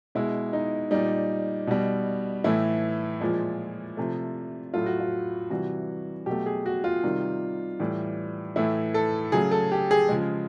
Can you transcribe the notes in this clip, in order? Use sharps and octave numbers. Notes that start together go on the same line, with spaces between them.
B2 G#3 E4
D#4
A#2 G3 D#4
B2 G3
A2 E3 A3 E4
A#2 F3 G#3
C3 F3 A3
A2 F#3 A3 F4
F#4
F4
C3 E3 G3 F#4
B2 F#3 A3 G4
G#4
F#4
F4
C3 D#3 G3
A2 E3 G3
A2 E3 A3 E4
A4
C#3 F#3 A3 G#4
A4
G4
G#4
C#3 F3 G#3